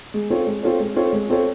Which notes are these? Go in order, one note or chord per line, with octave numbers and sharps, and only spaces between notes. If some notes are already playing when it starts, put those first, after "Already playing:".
G#3
C4 F4 A4 C#5
G#3
C4 F4 A4 C#5
G#3
C4 F4 A4 C#5
G#3
C4 F4 A4 C#5